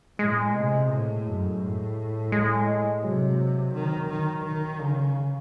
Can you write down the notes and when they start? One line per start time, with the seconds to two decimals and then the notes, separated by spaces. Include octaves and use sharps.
0.19 A2 G#3
0.55 C3
0.91 A2
1.26 F#2
1.61 A2
2.32 G#3
3.03 C3 F#3
3.74 D#3
4.09 D#3
4.45 D#3
4.81 C#3
5.07 D#3
5.16 E3